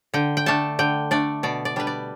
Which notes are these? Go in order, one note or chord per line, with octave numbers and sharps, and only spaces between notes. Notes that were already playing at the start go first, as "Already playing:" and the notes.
D3 G5
G5
A3 D4 A5
D3 G5
A3 D4 D5
B2 D5
D5
G3 D4 B4
D5